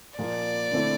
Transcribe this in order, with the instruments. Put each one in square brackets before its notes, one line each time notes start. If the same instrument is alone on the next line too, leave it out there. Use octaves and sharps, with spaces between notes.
[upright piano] A#2 F3 A#3 F4 [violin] D5
[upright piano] D3 A3 C4 E4